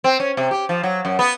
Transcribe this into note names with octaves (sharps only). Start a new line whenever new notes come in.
C4
C#4
C3
G4
F3
F#3
F#2
B3